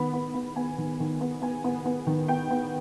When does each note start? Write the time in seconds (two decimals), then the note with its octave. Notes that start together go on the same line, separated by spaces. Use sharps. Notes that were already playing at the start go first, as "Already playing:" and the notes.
Already playing: D#3 B3 B5
0.14 B3
0.34 B3
0.56 B3 G#5
0.78 D#3
1.00 D#3
1.21 B3
1.42 B3 G#5
1.64 B3
1.85 B3
2.07 D#3
2.28 B3 G5
2.51 B3